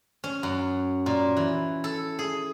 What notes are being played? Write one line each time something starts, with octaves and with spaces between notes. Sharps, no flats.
C#4
F#2
A#2
E3
A4
G#4